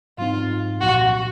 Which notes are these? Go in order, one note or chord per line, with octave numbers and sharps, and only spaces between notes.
G#2 F#3 C4 D#4 F4
C2 A#2 F3 F#4